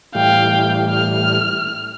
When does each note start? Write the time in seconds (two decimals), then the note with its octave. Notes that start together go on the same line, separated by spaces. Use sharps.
0.15 A2 E3 G3 F5 G5
0.91 F6